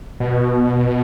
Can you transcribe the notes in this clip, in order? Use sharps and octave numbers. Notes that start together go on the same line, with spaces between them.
B2